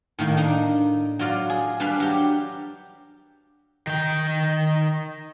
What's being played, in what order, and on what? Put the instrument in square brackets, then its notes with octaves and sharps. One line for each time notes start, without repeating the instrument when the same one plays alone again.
[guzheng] A2 D#3 A#3
D4 D#4
F#3 F4 D5 F5
G#4
G3 D4 B4 F5
F#3 G4
[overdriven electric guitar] D#3 G5